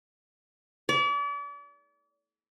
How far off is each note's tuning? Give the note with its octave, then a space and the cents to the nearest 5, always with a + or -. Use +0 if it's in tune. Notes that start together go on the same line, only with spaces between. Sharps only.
D5 -40